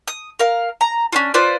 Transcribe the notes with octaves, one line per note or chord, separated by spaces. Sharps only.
D#6
A#4 F5
A#5
C#4 D4 F4
F4 B4 C5 D5